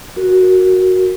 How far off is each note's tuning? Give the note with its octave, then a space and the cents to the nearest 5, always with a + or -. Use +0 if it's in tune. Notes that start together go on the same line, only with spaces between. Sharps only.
F#4 +0 A#4 +0